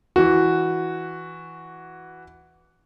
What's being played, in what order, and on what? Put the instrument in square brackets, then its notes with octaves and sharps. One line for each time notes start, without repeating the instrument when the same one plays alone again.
[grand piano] E3 F#4